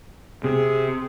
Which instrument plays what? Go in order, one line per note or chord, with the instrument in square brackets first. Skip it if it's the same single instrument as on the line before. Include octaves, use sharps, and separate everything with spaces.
[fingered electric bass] C3 [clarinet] G#4